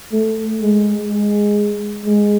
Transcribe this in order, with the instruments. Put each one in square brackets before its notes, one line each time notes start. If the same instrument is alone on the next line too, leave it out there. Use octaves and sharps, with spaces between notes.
[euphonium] A3
G#3
G#3
G#3